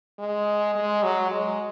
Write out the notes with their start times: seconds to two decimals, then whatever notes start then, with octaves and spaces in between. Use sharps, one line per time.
0.19 G#3
0.75 G#3
1.03 F#3
1.31 G#3